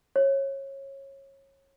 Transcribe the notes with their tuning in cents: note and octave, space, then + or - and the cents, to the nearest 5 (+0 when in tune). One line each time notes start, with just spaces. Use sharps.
C#5 -25